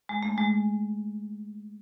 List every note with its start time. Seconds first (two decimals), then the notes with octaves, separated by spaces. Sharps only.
0.09 G#3
0.23 A3
0.38 G#3